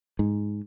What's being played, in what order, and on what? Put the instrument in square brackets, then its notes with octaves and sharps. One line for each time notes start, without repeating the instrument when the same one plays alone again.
[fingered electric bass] G#2